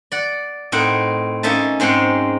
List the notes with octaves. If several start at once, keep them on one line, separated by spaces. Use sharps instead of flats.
D5 F#5
A2 C4 D#4 A#4 F#5
A#3 C#4 D#4 E5 A5
G#2 G#3 C4 C#4 F#5